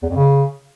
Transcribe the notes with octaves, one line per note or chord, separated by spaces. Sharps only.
E2
F2
C#3